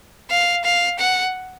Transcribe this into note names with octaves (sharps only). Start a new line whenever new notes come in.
F5
F5
F#5